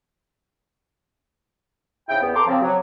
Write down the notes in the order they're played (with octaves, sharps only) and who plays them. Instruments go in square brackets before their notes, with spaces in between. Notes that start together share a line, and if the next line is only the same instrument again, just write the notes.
[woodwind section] G#2 C#3 E4 G5
E2 B3
A5 A#5 C6 D6
C#3 F3 C4
F#3